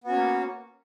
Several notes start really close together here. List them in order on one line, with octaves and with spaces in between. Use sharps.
B3 F#4 C#4 C#5 A#3